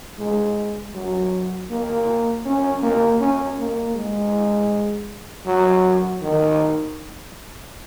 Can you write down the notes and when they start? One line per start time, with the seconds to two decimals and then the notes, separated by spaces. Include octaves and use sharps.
0.19 G#3
0.94 F#3
1.70 A#3
2.45 C#4
2.82 A#3
3.20 C#4
3.58 A#3
3.95 G#3
5.46 F#3
6.22 D#3